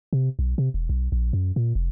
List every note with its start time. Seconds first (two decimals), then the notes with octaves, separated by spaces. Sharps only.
0.13 C3
0.39 B1
0.58 C3
0.74 E1
0.89 B1
1.12 A#1
1.33 F#2
1.56 A#2
1.75 F1